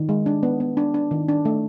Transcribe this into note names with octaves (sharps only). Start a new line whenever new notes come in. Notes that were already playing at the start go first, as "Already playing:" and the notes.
Already playing: D#3
G#3
D4
B3
B3
D4
D4
D#3
D4
A3